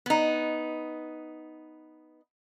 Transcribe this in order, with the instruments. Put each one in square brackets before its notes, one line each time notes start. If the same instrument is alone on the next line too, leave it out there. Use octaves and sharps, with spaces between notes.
[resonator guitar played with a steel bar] B3 D#4